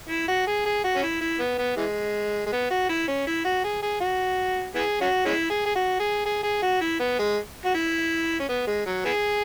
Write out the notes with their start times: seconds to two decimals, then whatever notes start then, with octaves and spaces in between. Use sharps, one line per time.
0.09 E4
0.28 F#4
0.47 G#4
0.65 G#4
0.84 F#4
0.96 C#4
1.03 E4
1.21 E4
1.39 B3
1.58 B3
1.77 E3 G#3
2.46 G#3
2.52 B3
2.70 F#4
2.89 E4
3.08 C#4
3.27 E4
3.45 F#4
3.64 G#4
3.82 G#4
4.01 F#4
4.75 B3 E4 G#4
5.01 C#4 F#4
5.26 G#3 C#4 E4
5.50 G#4
5.66 G#4
5.75 F#4
6.00 G#4
6.26 G#4
6.43 G#4
6.62 F#4
6.81 E4
7.00 B3
7.19 G#3
7.65 F#4
7.74 E4
8.40 C#4
8.49 B3
8.67 G#3
8.86 F#3
9.05 B3 E4 G#4